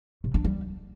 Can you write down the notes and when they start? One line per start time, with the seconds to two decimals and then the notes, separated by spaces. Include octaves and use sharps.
0.24 C3
0.34 D4
0.44 G3